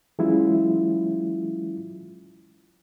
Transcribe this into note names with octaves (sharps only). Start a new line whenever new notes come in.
E3 F#3 G#3 C#4 E4 F4